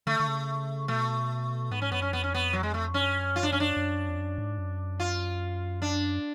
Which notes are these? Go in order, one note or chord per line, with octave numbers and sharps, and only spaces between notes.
D3 A3
D3
C#3
B2 A3
G#2 B3
C#4
F#2 B3
C#4
F2 B3
C#4
B3
F#3
G#3
A3
F#2 C#4
F4
D4
C#4
D4
F#2
F2
F#2
G#2
F#2
F4
D4